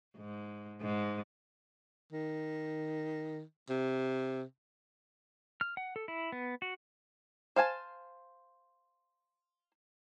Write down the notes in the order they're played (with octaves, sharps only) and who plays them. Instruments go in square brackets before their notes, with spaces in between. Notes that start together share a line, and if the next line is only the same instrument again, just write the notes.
[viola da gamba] G#2
G#2
[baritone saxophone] D#3
C3
[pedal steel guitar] F6
F#5
A4
E4
B3
F#4
[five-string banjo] C5 F5 G#5 A5